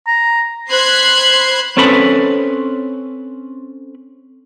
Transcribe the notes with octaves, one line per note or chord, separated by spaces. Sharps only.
A#5
C5 B5 C6 F#6 G#6 C7
C4 C#4 A4 B4 B5